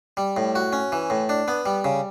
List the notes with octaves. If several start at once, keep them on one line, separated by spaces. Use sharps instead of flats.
G3
A2
F#4
C#4
E3
A2
D4
B3
G3
C#3